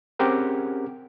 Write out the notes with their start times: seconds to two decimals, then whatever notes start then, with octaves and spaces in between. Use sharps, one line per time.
0.19 C4 C#4 G4 G#4 A#4 F#5